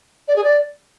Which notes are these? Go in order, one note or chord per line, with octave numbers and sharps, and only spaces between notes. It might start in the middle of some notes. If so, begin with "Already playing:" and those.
D5
G#4
D5